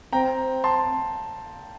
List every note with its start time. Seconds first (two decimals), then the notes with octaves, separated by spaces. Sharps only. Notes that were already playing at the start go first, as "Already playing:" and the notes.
0.12 C4 G5 A#5
0.64 A5 C6